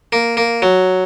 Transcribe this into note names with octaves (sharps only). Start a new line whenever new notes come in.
A#3
A#3
F#3